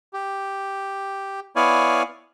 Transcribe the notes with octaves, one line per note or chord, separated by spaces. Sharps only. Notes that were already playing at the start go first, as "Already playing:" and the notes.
G4
B3 E4 C#5 D5 F5 G#5